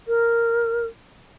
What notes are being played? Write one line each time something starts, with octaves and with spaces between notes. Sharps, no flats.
A#4